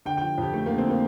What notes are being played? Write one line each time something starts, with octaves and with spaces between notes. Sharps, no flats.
D3 G5
F3 G5
F2 G4
A3
D3 A#3
C4
F3 A#3